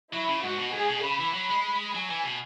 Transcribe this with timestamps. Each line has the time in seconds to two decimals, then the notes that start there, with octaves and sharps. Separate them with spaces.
0.12 F#3 E4
0.28 C#3
0.42 G#2 F#4
0.58 B2
0.73 G#2 G#4
0.89 B2
1.03 C#3 B5
1.19 E3
1.34 F#3 B5
1.49 G#3
1.94 F#3 G#5
2.10 E3
2.24 B2